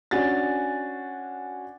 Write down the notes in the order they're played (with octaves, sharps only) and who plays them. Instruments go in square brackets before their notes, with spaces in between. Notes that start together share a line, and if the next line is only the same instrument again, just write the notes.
[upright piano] C#4 D4 F#4 G#5 A6